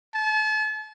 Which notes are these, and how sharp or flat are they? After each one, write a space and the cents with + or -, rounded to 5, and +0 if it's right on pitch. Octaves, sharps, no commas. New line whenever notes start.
A5 -40